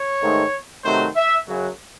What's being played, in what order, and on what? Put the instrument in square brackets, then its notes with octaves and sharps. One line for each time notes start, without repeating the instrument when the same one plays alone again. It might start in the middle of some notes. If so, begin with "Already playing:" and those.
Already playing: [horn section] C#5
G#2 D#3 A3
C3 D#3 F#3 A3 C5
E5
F#2 C#3 F#3